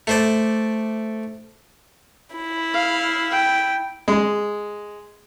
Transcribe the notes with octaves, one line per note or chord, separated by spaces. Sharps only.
A3 C5 D5
E4
F5
G5
G#3